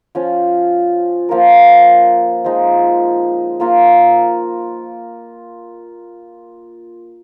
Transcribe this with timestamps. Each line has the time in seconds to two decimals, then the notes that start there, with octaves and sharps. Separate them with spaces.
0.15 F3 C#4 F4
1.29 F3 A#3 F4 A#4
2.44 F3 G#3 D#4
3.60 A#3 F4 A#4